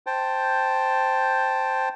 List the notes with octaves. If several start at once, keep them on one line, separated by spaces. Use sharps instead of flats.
C5 G5 A5